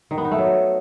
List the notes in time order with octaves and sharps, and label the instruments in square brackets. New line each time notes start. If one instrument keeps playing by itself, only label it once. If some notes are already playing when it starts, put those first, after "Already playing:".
[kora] D#3
B3
D#4
A3
F#3